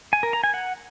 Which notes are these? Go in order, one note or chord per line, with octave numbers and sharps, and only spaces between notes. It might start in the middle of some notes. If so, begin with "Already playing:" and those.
G#5
A#4
A#5
G#5
F#5